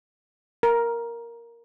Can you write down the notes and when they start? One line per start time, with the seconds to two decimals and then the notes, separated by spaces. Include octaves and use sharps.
0.63 A#4